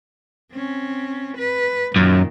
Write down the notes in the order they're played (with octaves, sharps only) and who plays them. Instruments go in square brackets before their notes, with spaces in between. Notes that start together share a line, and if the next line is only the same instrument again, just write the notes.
[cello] C4 C#4
B4
[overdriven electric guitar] F#2 [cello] A#2 D#3